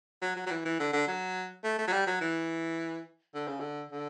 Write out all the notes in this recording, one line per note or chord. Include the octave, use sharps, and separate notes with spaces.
F#3
F#3
F#3
E3
E3
D3
D3
F#3
A3
A3
F#3
G3
F#3
E3
D3
C#3
D3
D3